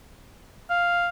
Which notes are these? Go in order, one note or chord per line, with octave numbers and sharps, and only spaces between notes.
F5